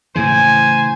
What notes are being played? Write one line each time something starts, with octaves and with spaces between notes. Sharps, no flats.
A2 C#3 E3 C5 G#5